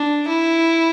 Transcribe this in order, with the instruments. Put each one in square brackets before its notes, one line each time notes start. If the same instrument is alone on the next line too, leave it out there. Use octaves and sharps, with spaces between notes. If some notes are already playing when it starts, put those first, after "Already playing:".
Already playing: [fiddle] D4
E4